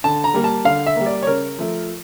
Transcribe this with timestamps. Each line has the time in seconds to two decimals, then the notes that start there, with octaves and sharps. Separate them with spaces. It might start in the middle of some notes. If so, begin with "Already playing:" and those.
0.04 D3 A5
0.24 A#5
0.34 G3 A#3
0.44 A5
0.65 D3 F5
0.86 E5
0.96 G3 A#3
1.06 D5
1.23 C#5
1.27 C#3 A#4
1.58 F3 A3